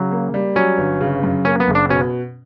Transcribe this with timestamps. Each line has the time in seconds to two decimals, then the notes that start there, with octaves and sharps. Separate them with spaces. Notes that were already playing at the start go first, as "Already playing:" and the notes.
Already playing: C#3 F#3
0.12 A#3
0.34 G3
0.56 F#3 C#4
0.78 G1
1.01 C#3
1.23 F#2
1.45 A#3 C#4
1.60 B3
1.68 F#1
1.75 D4
1.89 B2 C#4